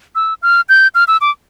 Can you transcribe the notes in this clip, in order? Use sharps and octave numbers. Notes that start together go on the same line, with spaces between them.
E6
F6
G6
F6
E6
D6